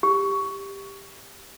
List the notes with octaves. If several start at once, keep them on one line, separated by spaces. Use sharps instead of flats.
G4